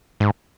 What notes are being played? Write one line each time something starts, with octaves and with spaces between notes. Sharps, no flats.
G#2